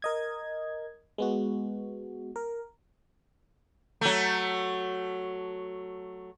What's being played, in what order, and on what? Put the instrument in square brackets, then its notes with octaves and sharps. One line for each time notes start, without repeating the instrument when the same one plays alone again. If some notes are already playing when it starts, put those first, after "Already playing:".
[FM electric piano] A#4 D#5 G#6
G#3 B3 F#4
A#4
[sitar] F#3 A3